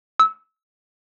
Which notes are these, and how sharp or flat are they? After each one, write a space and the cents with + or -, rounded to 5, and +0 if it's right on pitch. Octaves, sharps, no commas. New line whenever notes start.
E6 -25